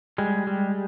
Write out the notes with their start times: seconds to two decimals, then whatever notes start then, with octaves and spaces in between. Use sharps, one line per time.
0.18 G3 G#3
0.47 G3